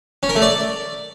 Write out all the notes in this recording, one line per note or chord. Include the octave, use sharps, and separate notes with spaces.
C#4
A#4
A3
D5